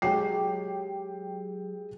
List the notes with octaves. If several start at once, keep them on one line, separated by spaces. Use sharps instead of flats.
F#3 G#3 G4 G5 C7